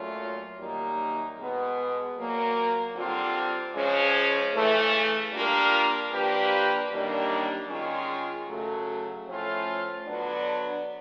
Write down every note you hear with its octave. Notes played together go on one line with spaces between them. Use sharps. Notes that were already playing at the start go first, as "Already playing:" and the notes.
Already playing: A#2 F#3 A3 C#4 F4
F#2 D#3 G3 A#3 D#4
B2 G#3 B3
A#2 F#3 A#3
D3 G3 C4 F4
C#3 F3 G#3 C#4
C#3 E3 A3
G3 A#3 D4 F4 A#4
F3 A#3 D4 G4 B4
F#2 D#3 G3 A#3 D4
D#3 G#3 C#4 F4
F#2 C#3 F#3 A3
A2 F3 A3 C#4 F4
D3 F#3 B3 D4